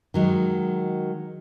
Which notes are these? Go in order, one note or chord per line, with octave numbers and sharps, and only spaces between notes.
D#3 F#3 G#3